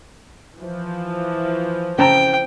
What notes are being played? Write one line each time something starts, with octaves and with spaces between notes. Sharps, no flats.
E3 F3
C#3 C4 G5 A5 A#5